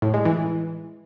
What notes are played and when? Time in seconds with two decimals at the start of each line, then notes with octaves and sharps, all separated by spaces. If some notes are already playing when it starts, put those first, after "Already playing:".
0.02 A2
0.14 G#3
0.25 E3